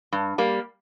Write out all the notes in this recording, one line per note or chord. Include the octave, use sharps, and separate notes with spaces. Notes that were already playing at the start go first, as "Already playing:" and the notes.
G2
G3 A#3